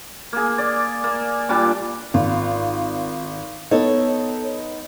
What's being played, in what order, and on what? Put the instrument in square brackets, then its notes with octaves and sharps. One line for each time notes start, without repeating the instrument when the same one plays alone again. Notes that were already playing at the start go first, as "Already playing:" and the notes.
[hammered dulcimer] A#3 G#4
D5
A#3
A#2 G3 D4 D6
[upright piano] G#1 [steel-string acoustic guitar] F4
[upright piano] B3 D#4 [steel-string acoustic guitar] A4 C#5